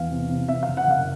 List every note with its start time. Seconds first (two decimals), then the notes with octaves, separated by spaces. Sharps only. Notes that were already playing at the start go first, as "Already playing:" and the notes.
Already playing: E2 F5
0.11 C3
0.29 C3
0.49 C3 E5
0.63 F5
0.68 F#1
0.77 F#5
0.87 F#1 F5